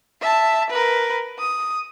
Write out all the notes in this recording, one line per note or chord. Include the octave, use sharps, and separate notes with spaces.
E5 A5
A#4 B4
D#6